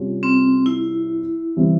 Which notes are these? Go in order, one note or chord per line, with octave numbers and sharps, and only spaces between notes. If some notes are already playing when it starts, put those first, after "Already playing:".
Already playing: C3 G3 C#4 F4
C4
E4
C3 E3 G3 C4